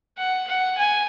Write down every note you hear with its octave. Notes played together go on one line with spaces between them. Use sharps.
F#5
F#5
G#5